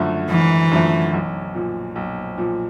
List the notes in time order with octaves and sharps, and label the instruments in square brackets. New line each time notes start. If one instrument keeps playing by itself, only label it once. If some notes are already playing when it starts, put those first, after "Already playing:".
Already playing: [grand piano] G#1 F#2 D3 F3 A3
[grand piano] G#1 [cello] E3
[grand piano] F#2 D3 F3 A3
B1
A#2 F3
B1
A#2 F3